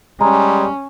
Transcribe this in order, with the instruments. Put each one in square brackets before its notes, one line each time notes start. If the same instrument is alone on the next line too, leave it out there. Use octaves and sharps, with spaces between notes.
[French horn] G3 [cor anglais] G#3 [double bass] C#4 [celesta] A#5